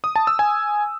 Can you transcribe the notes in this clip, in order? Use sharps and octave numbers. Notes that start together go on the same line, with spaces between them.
D#6
A5
E6
G#5